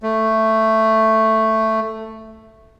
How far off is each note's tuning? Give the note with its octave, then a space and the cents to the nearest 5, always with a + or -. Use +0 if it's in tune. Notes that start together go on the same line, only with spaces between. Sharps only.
A3 +5